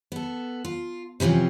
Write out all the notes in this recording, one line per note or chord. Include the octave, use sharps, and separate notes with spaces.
B3 A4
F4
C3 E3 F3 C4 C#4